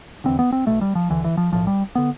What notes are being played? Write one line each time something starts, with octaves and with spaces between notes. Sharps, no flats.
F1 E2 D3 C4
B3
C4
B1 B2 A3
G3
F3
D2 D3 E3
E3
F3
B1 A2 F3
G3
D3 B3